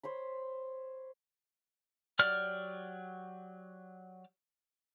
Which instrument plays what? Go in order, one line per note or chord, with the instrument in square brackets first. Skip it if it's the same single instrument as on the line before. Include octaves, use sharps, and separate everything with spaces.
[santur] C5 C#5 B5
[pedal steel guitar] F#3 G4 D5 F6